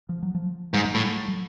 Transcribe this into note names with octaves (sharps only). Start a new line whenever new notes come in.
F3
F#3
F3
G#2 G3
G#3
A2 G3
F#3